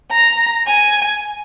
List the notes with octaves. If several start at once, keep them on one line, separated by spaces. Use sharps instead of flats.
A#5
G#5